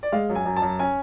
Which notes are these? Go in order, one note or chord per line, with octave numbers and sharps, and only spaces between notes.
D5
G#3 F5
F#2
G#5
F#2
A5
F#2
C#4 G#5